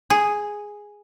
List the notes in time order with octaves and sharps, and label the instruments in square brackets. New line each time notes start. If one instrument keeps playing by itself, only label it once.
[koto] G#4